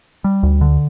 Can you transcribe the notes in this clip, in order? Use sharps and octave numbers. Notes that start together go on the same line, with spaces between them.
G3
D2
D3